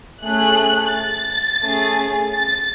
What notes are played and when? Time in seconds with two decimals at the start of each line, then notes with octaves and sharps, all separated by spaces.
0.24 A3 C#4 G#4 F#6
0.93 A6
1.63 A3 C#4 G#4
2.32 A6